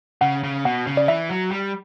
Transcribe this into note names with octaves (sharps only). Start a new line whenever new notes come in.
C#3 F#5
C#3
B2 F#5
C#3
D5
E3 E5
F#3
G3